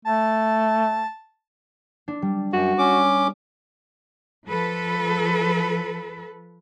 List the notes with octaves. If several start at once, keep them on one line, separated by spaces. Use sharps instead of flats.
A3 A5
D4
G3
F#2 F#4
C#4 D6
F3 A4 B4